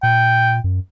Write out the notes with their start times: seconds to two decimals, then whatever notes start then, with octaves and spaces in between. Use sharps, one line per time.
0.03 A#2 G5
0.64 F#2